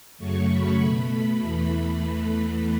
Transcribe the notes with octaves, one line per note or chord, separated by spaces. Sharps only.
F#2 C#3 F#3 A3 C#6
B5
B2 A3
B5
E2 E3 A3 B5